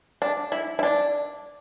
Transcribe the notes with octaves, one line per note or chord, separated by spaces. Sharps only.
D4
E4
E4
D4